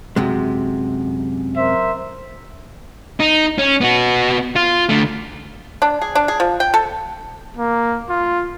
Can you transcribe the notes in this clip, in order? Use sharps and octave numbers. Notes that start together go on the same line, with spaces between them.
F#2 C3 G#3
A#4 C5 E5
D#4
C#4
B3 F#4
F4
D3 A3
D4
G#4
D4
G#4
F3
G5
A4
A#3
F4